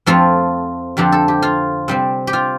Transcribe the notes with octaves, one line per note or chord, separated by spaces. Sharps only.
F2 F3 A3 C4 F4
F2 D3 F3 C4 G4
A4
G4
F4
C3 G3 C4
G4
F4